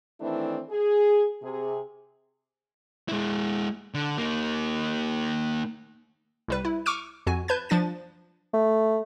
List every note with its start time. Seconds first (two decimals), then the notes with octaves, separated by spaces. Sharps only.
0.21 D#3 E3 A3 C4 D4 E4
0.70 G#4
1.42 C3 G#4
3.09 G#3 E4
3.94 D3
4.18 A#3 D#4
6.48 C2 G3 B4
6.65 E4
6.86 C#6 D6 E6 F6 D7 D#7
7.27 F2 F#4 G#5
7.48 B4 A5 G6 G#6
7.69 F3 D4 A6 D#7
8.53 A3